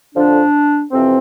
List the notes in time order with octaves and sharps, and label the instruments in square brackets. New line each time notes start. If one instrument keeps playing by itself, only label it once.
[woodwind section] F2 D3 F3 D4
F2 C3 E3 C4